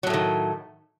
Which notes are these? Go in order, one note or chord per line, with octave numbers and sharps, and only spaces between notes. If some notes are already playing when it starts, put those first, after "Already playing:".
A2 D#3 F#3 A3